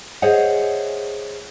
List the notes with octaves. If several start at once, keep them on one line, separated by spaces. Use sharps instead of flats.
G#4 C5 C#5 D#5 E5 F#5